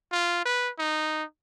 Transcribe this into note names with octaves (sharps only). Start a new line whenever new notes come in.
F4
B4
D#4